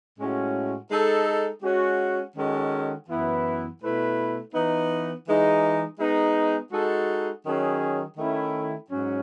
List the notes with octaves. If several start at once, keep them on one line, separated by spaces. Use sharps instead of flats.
A2 G#3 C#4 F#4
G#3 D#4 A4
G#3 C#4 F#4
D#3 G#3 C#4 F#4 A4
F#2 E3 B3 E4
B2 A3 E4 B4
E3 B3 D#4
E3 G#3 D#4 G#4
G#3 B3 D#4
G#3 D#4 F#4 A4
D#3 F#3 C#4 G#4
D#3 A3 C#4 E4 A4
G#2 F#3 C#4